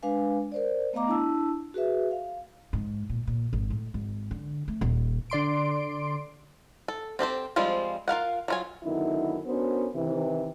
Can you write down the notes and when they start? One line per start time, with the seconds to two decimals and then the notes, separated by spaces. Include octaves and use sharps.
0.03 G#3 D4 B4 F5 G#5
0.52 A#4 C5 D5
0.93 A3 B3 D#5 F5 A#5 D6
1.07 D4 E4 A5 E6
1.74 F#4 G#4 B4 E5
2.11 F5
2.73 G#2
3.09 A#2
3.27 A#2
3.53 G#1
3.70 A2
3.94 G#1
4.31 D3
4.68 A3
4.81 D#1
5.30 D3 D5 C6 D7
6.88 A4
7.19 C4 G4 A4 C5
7.56 F3 G3 G#3 C4 F4
8.08 F4 A#4 F5 F#5
8.48 F#3 F4 G#5
8.83 F#2 D3 D#3 B3 D#4 E4
9.46 B3 C#4 D4 F#4 A#4 C5
9.95 C3 D#3 E3